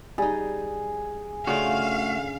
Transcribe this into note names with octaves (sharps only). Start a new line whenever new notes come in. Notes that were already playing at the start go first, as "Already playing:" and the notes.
G3 D#4 G#4
C#3 A3 D4 F4 F#4 F5